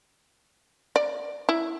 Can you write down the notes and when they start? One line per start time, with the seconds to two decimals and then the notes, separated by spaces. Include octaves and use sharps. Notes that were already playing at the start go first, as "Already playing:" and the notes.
0.96 D5
1.49 E4